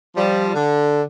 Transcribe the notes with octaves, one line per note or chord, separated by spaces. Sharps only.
F3 G3
D3